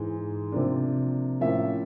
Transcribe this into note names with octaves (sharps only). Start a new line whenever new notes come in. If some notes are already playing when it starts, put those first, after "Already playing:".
Already playing: G#2 E3 G#3
C3 F3 A#3 D4
A2 F3 A#3 C#4 E5